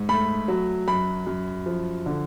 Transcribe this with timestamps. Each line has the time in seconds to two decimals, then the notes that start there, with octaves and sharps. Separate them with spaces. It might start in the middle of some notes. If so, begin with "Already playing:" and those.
Already playing: G#2
0.09 A3 B5
0.48 F#3
0.88 F#2 B5
1.27 F#2
1.66 F3
2.06 D3